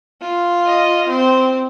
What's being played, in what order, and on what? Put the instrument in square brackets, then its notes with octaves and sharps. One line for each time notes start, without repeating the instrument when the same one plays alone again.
[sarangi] F4
[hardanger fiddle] D#5
[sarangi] C4 [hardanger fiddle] C5